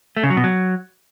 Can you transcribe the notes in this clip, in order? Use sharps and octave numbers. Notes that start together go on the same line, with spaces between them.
A3
C#3
F#3
B2
F#3